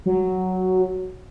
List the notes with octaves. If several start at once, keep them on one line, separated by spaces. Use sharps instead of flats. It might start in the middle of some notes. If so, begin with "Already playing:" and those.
F#3